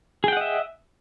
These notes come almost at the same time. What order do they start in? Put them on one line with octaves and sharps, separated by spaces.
G#4 G5 F#5 D#5 E5